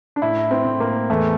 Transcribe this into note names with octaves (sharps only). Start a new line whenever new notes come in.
D4
A2 E4
C4
A2
A#3
E2 A3